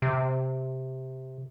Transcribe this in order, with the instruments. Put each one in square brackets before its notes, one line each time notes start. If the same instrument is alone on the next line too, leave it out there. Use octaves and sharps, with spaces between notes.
[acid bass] C3